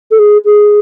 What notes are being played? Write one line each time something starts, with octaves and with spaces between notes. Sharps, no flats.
A4
G#4
G#4